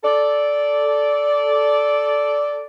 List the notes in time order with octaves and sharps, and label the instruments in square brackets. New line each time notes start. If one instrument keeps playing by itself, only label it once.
[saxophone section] A4 D5